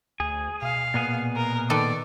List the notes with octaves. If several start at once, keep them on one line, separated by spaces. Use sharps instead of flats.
D2 G#4
B2 F5
A#2 B3 G#4
A#4
D#3 A4 B4 D5